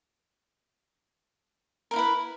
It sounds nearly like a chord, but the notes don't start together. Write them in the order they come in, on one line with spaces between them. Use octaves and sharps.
A#4 D#4 E4 B4